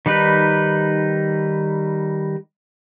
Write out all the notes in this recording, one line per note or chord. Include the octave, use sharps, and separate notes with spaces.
D#3 G3 D#4 B4